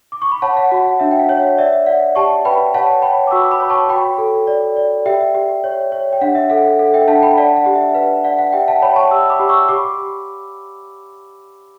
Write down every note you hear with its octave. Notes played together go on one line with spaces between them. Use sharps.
D6
C#6
B5
C#5 F#5 A5
F#5
F#4 F#5
F#5
D4 E5
G5
F#5
C#5
F#5
D5 E5
D5 F#5
G4 A5 C#6
B4 G5 B5
C#5 F#5 A5
C#5 G5 B5
D6
F#4 C#6 E6
B5 D6
C#5
B5
A5 C#6
F#4 G5 B5
A4
D5
D5
G4 E5 G5
G4
C#5
C#5
G5
D4 F#5
E5
A4 F#5
F#5
A4 F#5
E5 G5
D4 F#5 A5
G5 B5
D5 F#5 A5
F#5
G4
E5
B4 F#5
D5 F#5
F#5
G4 E5 G5
F#5 A5
C#5 G5 B5
A5 C#6
G4 C#6 E6
B5 D6
G4
C#6 E6
G4 B5 D6